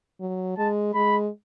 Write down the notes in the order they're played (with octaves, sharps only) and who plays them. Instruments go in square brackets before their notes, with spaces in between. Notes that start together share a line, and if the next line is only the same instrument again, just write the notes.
[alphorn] F#3
[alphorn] G#3 [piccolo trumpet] A5
[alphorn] G#3 [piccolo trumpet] B5